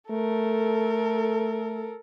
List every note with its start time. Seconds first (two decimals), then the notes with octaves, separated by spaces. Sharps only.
0.10 A3 A4 A#4